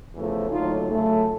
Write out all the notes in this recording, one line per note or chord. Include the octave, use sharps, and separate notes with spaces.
E2 C#3 F3 A3
D#2 D3 F#3 A3 D#4 F4
F#2 C#3 F#3 A3